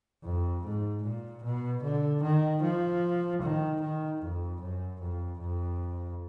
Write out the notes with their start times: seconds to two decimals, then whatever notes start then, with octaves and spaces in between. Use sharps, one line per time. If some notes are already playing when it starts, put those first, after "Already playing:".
0.24 F2
0.64 G#2
1.03 A#2
1.43 B2
1.83 D3
2.23 D#3
2.63 F3
3.42 D#3
3.81 D#3
4.22 F2
4.61 F#2
5.02 F2
5.40 F2